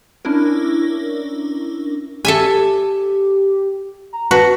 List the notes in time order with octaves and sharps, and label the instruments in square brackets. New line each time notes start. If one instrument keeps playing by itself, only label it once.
[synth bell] C#4 D4 E4 A#4
[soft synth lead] G4 [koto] A4 E5 G#5
[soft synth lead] A#5
[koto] F#4 [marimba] B4 A5 [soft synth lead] B6